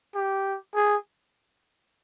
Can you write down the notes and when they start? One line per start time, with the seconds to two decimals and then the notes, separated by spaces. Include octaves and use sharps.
0.15 G4
0.75 G#4